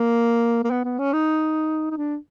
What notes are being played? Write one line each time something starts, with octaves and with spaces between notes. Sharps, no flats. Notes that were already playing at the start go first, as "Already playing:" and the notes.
Already playing: A#3
A#3
B3
B3
C#4
D#4
D#4
D4